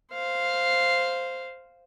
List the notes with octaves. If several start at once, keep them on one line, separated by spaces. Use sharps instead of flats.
C5 F5